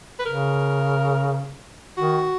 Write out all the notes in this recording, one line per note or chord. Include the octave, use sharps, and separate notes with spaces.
B4
C#3 A#4
D#3 F#4